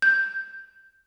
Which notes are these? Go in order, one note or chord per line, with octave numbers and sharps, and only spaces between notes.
G6